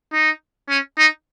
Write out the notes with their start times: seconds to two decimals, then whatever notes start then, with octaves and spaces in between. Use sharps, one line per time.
0.13 D#4
0.69 C#4
0.98 D#4